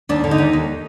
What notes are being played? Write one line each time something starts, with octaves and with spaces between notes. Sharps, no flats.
D#2 D4
D3
D#4
D#2
D#2